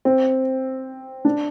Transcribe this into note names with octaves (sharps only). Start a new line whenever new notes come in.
C4
D4